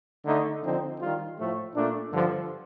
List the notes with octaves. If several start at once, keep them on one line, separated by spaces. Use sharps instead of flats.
D3 A3 D#4
D3 F3 C4 D#4
D#3 G3 D4 F4
A2 F3 A3
A#2 A3 D4
G2 D3 F3